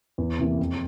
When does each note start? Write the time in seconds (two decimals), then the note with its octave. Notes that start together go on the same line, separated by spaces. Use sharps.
0.18 E2
0.39 C3 E3 A#3
0.59 F2